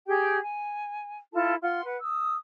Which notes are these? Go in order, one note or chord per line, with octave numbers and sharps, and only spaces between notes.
G4 G#4 G5
G#5
E4 F4 A4 A5
F4 F#5 C6
B4 F#5
D#6 E6